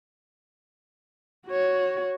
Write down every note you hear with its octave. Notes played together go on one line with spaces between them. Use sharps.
F#4 C#5